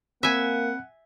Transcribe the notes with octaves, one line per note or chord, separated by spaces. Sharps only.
A#3 C4 E5 F#5 G#5 B5